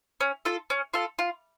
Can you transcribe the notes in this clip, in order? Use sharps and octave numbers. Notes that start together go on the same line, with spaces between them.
C#4
F4 A4
C#4
F4 A4
F4